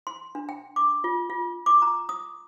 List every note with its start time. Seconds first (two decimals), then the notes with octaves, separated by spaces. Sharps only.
0.07 C6
0.35 D4
0.49 G5
0.76 D6
1.04 F4
1.30 F4
1.66 D6
1.82 A#5
2.09 D#6